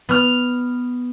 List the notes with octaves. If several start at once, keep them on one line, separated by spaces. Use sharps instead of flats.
B3 F6